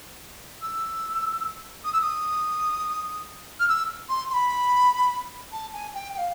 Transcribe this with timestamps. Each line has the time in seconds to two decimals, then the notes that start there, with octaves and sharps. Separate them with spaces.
0.61 E6
1.84 D#6
1.92 E6
2.01 D#6
3.59 F6
3.68 E6
4.09 C6
4.30 C6
4.33 B5
5.52 A5
5.72 G#5
5.93 G5
6.13 G5
6.17 F5